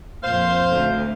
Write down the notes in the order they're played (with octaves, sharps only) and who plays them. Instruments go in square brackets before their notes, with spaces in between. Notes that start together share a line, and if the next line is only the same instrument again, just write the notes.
[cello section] F2 A#2 [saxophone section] C5 F5
[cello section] D2